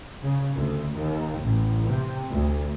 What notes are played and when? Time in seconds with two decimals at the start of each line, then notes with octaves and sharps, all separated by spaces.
0.24 C#3
0.55 D2
0.98 D#2
1.41 A1
1.87 C3
2.33 D2